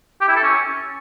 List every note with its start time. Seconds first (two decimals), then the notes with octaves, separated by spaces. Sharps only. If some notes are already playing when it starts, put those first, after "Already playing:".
0.21 G4
0.29 E4
0.36 A4
0.43 C#4